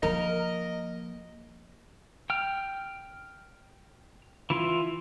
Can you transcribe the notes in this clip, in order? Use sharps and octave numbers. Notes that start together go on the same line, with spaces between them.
F3 A#3 A#4 D#5
G5 F6
E3 E4 F4